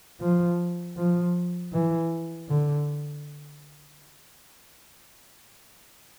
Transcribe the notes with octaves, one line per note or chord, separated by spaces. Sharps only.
F3
F3
E3
D3